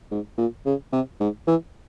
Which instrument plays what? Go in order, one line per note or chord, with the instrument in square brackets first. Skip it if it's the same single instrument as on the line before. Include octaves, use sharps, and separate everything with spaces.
[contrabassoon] G#2
A#2
C#3
C3
G#2
E3